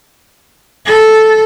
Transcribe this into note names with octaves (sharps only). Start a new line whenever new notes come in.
A4